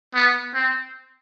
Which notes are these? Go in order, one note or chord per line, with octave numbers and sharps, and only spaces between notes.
B3
C4